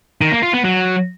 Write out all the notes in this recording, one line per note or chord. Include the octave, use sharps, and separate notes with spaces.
D#3
A#3
F4
B3
F#3